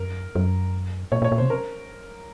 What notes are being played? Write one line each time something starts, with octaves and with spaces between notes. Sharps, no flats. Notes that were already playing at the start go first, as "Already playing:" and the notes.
Already playing: F#2 A#4
F#2
A#2 C#5
A#2
C#5
A#2
C5
C3
A#4